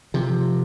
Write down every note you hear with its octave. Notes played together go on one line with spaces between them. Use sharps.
C3 F3